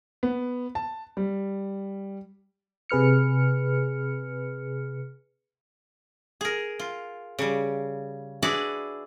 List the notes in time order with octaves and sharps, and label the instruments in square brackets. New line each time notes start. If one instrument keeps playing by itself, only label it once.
[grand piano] B3
A5
G3
[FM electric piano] C3 G#4 B4 F6 C#7
[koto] G#4 A#4
F4
C#3 G3
D4 E4 F#4 G#4 B4 D5